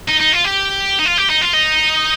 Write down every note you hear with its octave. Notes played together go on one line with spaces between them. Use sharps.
D#4
D#4
F4
G4
D#4
F4
G4
D#4
F4
D#4